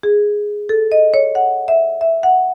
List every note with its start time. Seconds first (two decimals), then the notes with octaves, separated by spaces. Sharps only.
0.03 G#4
0.69 A4
0.92 D#5
1.14 C#5
1.35 F#5
1.68 E5
2.01 E5
2.23 F#5